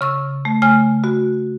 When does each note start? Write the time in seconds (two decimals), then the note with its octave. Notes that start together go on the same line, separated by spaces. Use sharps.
0.01 C#3 C#6 E6
0.45 A3
0.62 C#3 A3 G#5 F6
1.04 F#4